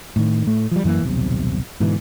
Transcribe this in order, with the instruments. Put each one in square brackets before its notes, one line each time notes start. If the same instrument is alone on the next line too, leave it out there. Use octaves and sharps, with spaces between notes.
[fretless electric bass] A2 D#3
A2 A3
F3 G3
F#2 E3 F#3 A#3
D#1 B1 C3
G#2 B2 D3 E3